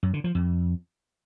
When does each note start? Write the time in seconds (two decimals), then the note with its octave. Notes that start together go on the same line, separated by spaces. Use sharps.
0.03 F#2
0.13 D3
0.24 F3
0.35 F2